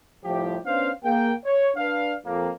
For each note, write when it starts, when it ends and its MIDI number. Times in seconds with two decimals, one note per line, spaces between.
0.25 0.57 36
0.25 0.57 45
0.25 0.57 53
0.25 0.57 67
0.66 0.90 59
0.66 0.90 61
0.66 0.90 62
0.66 0.90 72
0.66 0.90 77
1.04 1.32 58
1.04 1.32 68
1.04 1.32 79
1.45 1.69 73
1.77 2.14 62
1.77 2.14 71
1.77 2.14 74
1.77 2.14 77
2.26 2.50 41
2.26 2.50 58